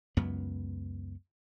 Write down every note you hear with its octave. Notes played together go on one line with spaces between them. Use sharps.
C#2 F#2 B3